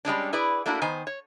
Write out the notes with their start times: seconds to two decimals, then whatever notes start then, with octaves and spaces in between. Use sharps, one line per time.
0.05 G3 G#3 C#4 D4
0.33 E4 G#4 B4 D5
0.66 A3 A#3 D4 E4 F#4
0.82 D#3 B3 C5 G#5
1.07 C#5